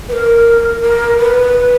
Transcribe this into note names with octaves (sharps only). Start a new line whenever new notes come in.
B4
A#4
A#4
B4